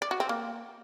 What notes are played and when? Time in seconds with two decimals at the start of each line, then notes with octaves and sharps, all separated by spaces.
0.02 D5
0.11 F#4
0.20 C4
0.29 A#3